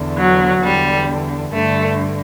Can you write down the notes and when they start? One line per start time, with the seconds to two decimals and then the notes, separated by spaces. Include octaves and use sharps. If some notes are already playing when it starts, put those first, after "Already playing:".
Already playing: E2 D3
0.18 F#3
0.62 E2 D3 G3
1.53 G2 D3 A3